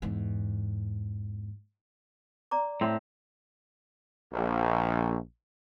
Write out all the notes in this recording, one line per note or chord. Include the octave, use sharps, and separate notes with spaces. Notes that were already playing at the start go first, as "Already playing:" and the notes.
E2 G#2
D5 A#5 D6
A2 C4
A#1